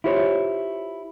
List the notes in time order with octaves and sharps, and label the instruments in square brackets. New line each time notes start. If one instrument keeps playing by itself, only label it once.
[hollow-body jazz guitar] E4 F4 G4 C5 C#5